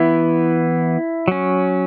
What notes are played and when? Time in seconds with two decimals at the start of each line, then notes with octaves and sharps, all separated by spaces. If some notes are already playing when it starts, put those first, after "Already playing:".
Already playing: E3 B3 E4
1.28 F#3 C#4